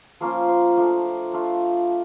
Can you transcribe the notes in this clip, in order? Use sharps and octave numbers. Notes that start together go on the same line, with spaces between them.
F3 A#3 C#4 F4 C5
C5
F3 A3 D4
A3 D4 F4